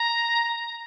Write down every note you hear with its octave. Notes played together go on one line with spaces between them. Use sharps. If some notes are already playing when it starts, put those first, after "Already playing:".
Already playing: A#5